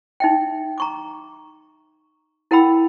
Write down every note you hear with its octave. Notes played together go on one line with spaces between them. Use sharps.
D#4 E5 G5
A#5 C#6 D6
E4 A#4 F#5 G5 B5 E6